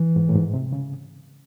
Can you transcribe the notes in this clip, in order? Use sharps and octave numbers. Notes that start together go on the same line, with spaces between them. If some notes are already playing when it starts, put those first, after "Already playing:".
Already playing: E3
G#2
A2
G#2
C3
C#3